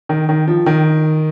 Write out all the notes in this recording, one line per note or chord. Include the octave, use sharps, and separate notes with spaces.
D#3
D#3
F3
D#3